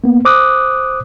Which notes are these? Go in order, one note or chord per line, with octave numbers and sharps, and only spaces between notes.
A#3 B3
C5 D6 D#6 F#6